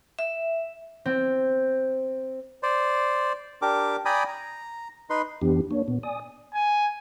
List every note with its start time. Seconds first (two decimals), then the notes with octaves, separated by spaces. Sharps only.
0.19 E5
1.06 C4
2.63 C5 D5
3.62 D4 G4 A#4 D6
4.05 D5 G5 G#5 A#5 B5 D#6
4.28 A#5
5.10 D#4 B4 C6
5.42 F2 E3 B3 D4 G4
5.71 A#3 D4 C#5
5.88 A#2 B3
6.03 D5 G#5 D#6
6.54 G#5